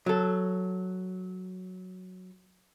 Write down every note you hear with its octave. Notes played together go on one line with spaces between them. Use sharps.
F#3 A4